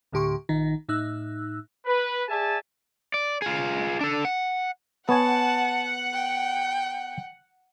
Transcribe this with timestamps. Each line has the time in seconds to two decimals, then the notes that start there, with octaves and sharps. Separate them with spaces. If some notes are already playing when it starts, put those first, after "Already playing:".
0.12 D2 A2 D3 G4 C6 C#6
0.49 A#1 D#3 D#4
0.89 A2 D#4 E6 F#6
1.86 B4
2.29 G#4 D5 E5 G#5 A5
3.14 D5
3.42 F4 G#4
4.01 D4 A4
4.25 F#5
5.09 B3 C#5 F#5 G#5 A5
6.14 G5